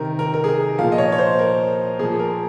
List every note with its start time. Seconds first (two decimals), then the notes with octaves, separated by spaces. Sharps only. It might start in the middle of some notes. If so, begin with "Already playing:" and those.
Already playing: C3 D#3 A#4
0.19 A#4
0.34 A#4
0.44 G#4
0.48 A#4
0.78 A#2 F3 F5
0.92 D#5
0.98 C#5
1.12 C#5
1.18 C5
1.39 A#4
1.99 A#2 F3 G#4
2.19 A#4